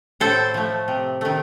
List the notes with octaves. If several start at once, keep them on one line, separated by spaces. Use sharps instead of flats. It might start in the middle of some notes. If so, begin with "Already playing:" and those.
A2 A4 C5
F3 A3
C3
D#3 A3